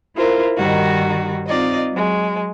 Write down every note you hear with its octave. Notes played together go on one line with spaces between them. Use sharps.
E4 F4 A#4 C5
G2 D#3 G3 D#4 F#4
C4 D#4 F4 D5 D#5
F#3 G#3